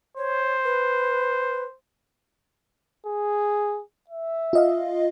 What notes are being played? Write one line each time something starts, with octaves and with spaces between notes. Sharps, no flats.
C5 C#5
B4
G#4
E5
F4 D#5 F5